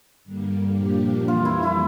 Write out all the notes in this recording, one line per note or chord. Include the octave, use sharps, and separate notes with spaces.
G2 D3 G3 A#3
A#2 F3 A#3 D4 G4
F2 E3 G3 A#3 F4
E4
E4